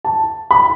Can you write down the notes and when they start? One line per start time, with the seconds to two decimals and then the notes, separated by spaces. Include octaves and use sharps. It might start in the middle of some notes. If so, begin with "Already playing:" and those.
0.05 A5
0.51 B5